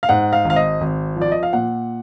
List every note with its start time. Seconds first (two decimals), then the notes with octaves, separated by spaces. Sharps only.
0.03 F5
0.09 G#2 F#5
0.33 F5
0.45 G#1
0.50 F5
0.56 D#5
0.81 G#1
1.16 F3
1.22 D5
1.32 D#5
1.43 F5
1.53 A#2 F#5